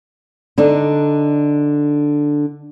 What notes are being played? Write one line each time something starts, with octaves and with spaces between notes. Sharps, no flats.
D3 D4 D#4